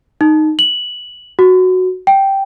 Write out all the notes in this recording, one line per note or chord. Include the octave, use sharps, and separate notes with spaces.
D#4
F#7
F#4
G5